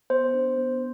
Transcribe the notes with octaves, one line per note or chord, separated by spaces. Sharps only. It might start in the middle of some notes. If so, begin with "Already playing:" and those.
B3 C5
D4
B3